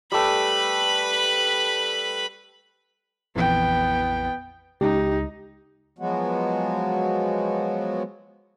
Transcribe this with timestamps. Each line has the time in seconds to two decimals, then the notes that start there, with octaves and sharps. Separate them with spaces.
0.12 G3 A3 B4 B5
3.36 A#1 F2 E3 B3 G5
4.81 C#2 D#4 G4
5.99 F3 F#3 G#3 B3 F#4